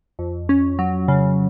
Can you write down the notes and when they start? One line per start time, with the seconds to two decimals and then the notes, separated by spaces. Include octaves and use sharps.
0.19 F2
0.49 C#4
0.79 F#3
1.08 C#3